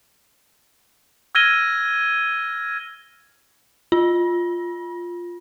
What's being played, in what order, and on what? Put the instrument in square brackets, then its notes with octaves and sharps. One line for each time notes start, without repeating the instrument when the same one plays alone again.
[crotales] E6 F6 G#6 A#6 D#7 G7
[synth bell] F4